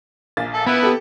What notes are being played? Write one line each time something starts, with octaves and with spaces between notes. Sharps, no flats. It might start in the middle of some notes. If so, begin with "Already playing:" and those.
A#1 A#3 A6
A4
B3 E4 B4
G4 A4